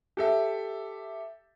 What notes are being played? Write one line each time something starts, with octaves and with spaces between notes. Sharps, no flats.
G4 A4 E5